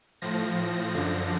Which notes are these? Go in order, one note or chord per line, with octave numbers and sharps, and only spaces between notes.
A2 F3 A#6
A#6
F#2 D3 F3 A#6